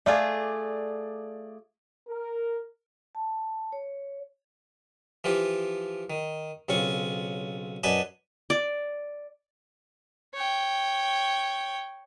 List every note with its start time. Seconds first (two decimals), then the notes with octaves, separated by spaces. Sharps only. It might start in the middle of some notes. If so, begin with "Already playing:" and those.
0.06 A3 F4 G#4 D5
2.08 A#4
3.15 A5
3.72 C#5
5.24 E3 F3 F4 G4
6.10 D#3
6.69 B1 C#3 C4 F4 C#6
7.83 F#2 B4 D5 D#5 G#5 A5
8.50 D5
10.35 C#5 G5